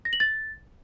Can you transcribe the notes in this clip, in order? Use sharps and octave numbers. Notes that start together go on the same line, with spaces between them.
A#6
F#7
A6